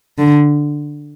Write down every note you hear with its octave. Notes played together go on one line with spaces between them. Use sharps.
D3